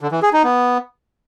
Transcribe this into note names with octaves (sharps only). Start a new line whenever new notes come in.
D3
E3
G#4
D#4
B3